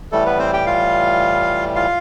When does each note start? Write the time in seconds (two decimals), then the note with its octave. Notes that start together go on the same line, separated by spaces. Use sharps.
0.12 A2 E3 G3 A3 A4
0.25 B3 B4
0.39 C4 C5
0.53 G4 G5
0.66 F4 F5
1.76 F4 F5